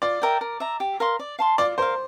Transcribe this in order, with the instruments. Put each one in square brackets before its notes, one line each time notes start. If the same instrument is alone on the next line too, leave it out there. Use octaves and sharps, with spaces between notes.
[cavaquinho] F4 [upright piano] D5
[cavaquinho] A#4 E5 G5
A#4
E5 A#5
G4
A#4 F5 C6
D5
F5 A5 C6
[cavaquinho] F4 [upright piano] D5
[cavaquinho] A#4 F5 [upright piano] C5